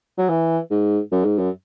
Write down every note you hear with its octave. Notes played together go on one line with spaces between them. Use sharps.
F#3
E3
G#2
F#2
G#2
F#2